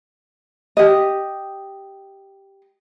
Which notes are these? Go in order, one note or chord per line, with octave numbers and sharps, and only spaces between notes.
G4 D#5